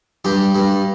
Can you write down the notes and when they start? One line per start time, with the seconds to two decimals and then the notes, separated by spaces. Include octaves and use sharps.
0.25 G2 G4
0.55 G2